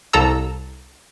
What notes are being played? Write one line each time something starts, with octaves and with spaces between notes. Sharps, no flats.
C2 A4 A5 A#5 E6